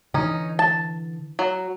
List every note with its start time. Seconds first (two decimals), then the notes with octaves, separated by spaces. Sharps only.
0.14 D3 E3 C#4 D#4
0.59 A5
1.39 F#3